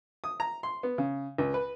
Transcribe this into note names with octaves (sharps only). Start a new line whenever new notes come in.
D#6
A#5
C6
B3
C#3
C#2
B4